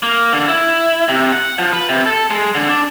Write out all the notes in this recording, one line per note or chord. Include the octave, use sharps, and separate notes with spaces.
A#3
D3
E4
C3
F#5
F3
B4
C3
A4
G#3
D3
D4